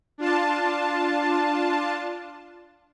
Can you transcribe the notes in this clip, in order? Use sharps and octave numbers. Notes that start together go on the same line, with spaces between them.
D4 F4 A5